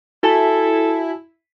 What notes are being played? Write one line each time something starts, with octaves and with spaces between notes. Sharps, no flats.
E4 F#4 A4 G#5 A5